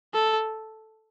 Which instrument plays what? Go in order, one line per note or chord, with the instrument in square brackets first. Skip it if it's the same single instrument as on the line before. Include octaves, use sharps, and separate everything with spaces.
[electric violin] A4